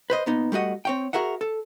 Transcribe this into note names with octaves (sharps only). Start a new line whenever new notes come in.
B4 C5 D#5
A#2 B3 D#4
G3 A3 F#4 D#5 F#5
C4 C#5 G5
F#4 G#4 A#4 E5 F#5
A4